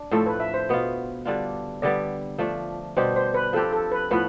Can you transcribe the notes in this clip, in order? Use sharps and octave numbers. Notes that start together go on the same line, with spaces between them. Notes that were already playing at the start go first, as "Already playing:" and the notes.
Already playing: D4
A2 F3 A3 C4 A4
B4
E5
C5
B2 B3 F4
D3 G3 D4 F4
D3 G3 B3 D5
F3 A3 D4
B2 G3 D4 G4 C5
C5
B4
F3 C4 G4 A4
A4
B4
A2 F3 B3 B4